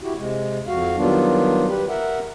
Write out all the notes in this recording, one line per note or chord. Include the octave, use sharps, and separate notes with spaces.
E4 F#4 G4
C3 G#3
F2 F#4 F5
D#3 F#3 G3 B3 D4 F4
G4 B4
A#4 E5 F#5